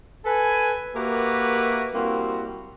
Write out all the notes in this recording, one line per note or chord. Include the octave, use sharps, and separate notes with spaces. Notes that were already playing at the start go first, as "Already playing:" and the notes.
A4 B4 G#5
A#3 F#4 G4 A#4 B4 E5
G3 A#3 C4 E4 F#4